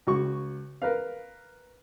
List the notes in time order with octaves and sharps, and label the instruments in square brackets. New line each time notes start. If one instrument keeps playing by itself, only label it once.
[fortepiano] C#2 F#4 C#6
A#4 B4 F5